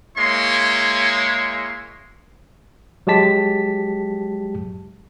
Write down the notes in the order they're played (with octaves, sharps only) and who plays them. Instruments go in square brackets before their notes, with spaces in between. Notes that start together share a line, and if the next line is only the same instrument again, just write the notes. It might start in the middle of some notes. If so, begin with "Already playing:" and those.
[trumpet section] G#3 A#3 E4 C#5 C6
[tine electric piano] F#3 G#3 G4 A5 B6